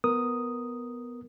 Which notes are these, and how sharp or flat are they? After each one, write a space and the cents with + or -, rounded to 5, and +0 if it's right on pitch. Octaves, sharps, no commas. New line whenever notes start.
B3 +0 A#4 +0 D#6 +0